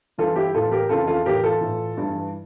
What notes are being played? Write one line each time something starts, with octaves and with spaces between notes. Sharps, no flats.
G2 E3 F4 A4
E4 G4
A2 E3 F4 A4
G4 A#4
F2 C#3 E3 F4 A4
F4 A4
A2 E3 G4 A#4
F4 A4
A2 E3
G2 E3